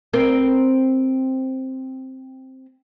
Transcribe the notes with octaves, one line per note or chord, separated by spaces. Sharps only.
C4 A#4